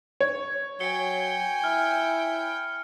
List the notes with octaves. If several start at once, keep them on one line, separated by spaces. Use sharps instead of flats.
C#5
F#3 G5 G#5 C#7 G7
E4 F6